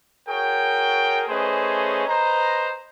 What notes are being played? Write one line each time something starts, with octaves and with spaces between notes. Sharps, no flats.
F#4 G#4 A#4 C#5 G5
A3 C#4 G#4 B4 C5 D#5
B4 C5 D#5 A#5